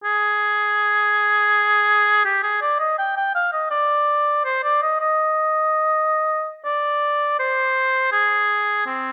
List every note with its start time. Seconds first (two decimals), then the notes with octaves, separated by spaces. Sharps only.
0.04 G#4
2.25 G4
2.43 G#4
2.62 D5
2.79 D#5
2.99 G5
3.17 G5
3.35 F5
3.53 D#5
3.71 D5
4.45 C5
4.64 D5
4.82 D#5
5.01 D#5
6.65 D5
7.39 C5
8.12 G#4
8.86 C4